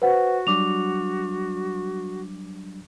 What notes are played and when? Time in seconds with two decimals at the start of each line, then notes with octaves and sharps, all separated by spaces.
0.02 F#4 B4 C5 F#5
0.47 F#3 G3 D4 D6 F7